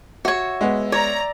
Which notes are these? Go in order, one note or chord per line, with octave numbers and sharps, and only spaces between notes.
F#4 C#5 E5
G#3 B3
C#5 D5 A#5